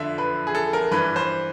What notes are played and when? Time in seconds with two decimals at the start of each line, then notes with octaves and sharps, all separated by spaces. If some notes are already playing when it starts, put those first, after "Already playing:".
Already playing: F2 D3 F3 E5
0.18 B4
0.47 G#4
0.55 A4
0.73 A#4
0.91 G2 E3 B4
1.16 C5